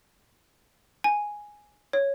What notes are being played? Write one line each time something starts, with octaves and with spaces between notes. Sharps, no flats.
G#5
C#5